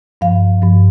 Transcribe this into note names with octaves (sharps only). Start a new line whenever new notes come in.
G2 F3 F5
G2 F3